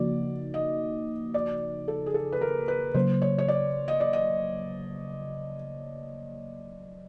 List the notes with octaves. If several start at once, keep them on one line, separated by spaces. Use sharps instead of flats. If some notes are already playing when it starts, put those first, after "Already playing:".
Already playing: C#3 F3 A#3 D#4 F#4 D5
D#5
D5
A4
G#4
A4
B4
A#4
B4
C#3 F#3 A#3 C5
C#5
C#5
D5
D#5
D5
D#5